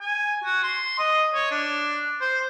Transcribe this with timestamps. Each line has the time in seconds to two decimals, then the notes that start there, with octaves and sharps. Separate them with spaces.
0.01 G#5
0.44 F#4
0.63 C6
0.99 D#5
1.35 C#5
1.51 D4
2.21 C5